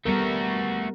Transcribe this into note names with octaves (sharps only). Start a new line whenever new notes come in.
G3 A3 B3 F#4 A#4